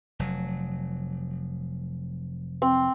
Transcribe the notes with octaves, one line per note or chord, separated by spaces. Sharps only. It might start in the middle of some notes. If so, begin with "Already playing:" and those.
F1 F#3
C4